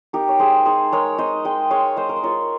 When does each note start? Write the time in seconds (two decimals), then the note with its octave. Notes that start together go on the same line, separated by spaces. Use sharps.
0.13 D#4 G4 A#4
0.29 C#5
0.39 G#3 G#4 C5
0.65 D#4 G#4 C5
0.92 G#3 A#4 C#5
1.18 D#4 C5 D#5
1.45 G#3 D#5 G5
1.70 G#3 C#5 F5
1.97 G#3 C5 D#5
2.09 A#4
2.16 C5
2.23 F4 A#4 C#5